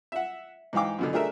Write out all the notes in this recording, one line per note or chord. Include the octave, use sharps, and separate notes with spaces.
E5 F#5
G#2 E3 F5 G5 D6
F#2 B2 D3
A3 D4 G#4 A#4 E5